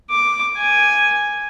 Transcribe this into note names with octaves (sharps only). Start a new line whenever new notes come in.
D6
G#5